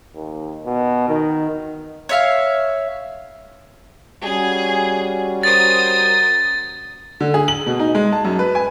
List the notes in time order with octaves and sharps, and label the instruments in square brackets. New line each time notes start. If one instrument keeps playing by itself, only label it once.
[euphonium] D#2
B2
D#3
[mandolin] C#5 E5 F5
[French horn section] G3 C#4 F#4 [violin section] G#4
[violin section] A#4 C5 D#6 [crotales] A6
[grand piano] D3
G#4
F#7
B2
D#4
G#3
A5
F#2
B4
G#5